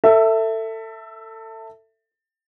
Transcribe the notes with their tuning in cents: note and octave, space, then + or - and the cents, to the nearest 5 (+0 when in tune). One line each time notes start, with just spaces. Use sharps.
A4 +25 E5 +0